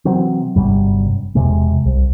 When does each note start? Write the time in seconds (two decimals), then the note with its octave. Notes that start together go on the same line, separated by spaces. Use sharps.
0.05 C3 E3 F#3 C4
0.56 G1 F#2 C3 G3
1.35 E1 C3 G#3
1.85 C2